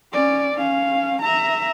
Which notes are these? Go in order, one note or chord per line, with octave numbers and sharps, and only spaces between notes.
C#4 D5
C#4 F5
E5 A#5